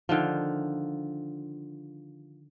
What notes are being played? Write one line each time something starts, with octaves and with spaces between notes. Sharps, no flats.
D3 D#3 F3